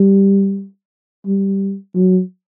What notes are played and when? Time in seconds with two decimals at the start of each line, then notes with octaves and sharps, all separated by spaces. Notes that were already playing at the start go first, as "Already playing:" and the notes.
Already playing: G3
1.27 G3
1.96 F#3